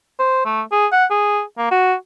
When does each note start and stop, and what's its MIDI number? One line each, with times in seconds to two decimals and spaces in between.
0.19 0.44 72
0.45 0.62 57
0.72 0.86 68
0.92 1.05 78
1.11 1.42 68
1.58 1.66 58
1.71 1.94 66